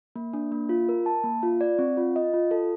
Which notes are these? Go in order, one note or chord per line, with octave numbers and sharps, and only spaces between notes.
A#3
D4
A#3
F4
A#4
A5
A#3
F4
D5
C4
F4
D#5
F4
A4